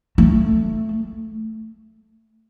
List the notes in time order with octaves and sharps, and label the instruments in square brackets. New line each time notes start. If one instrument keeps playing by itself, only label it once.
[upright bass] A3